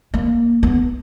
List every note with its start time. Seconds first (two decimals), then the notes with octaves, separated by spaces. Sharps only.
0.14 A#3
0.63 B3